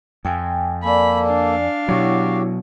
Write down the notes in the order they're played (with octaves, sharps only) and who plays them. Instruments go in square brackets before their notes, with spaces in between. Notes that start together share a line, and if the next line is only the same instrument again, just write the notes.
[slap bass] F2 [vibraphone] G5 G#5
[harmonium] A#3 A4 [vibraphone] D5 G#5 [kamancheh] B5
[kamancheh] D4 F5
[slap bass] B2 F#3 [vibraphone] E4 C#5 E6 [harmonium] F#4 G4